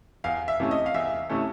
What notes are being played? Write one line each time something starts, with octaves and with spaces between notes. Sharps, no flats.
E2 F5
E5
C3 E3 A3 C#4
D#5
F5
E2 E5
C3 E3 A3 C#4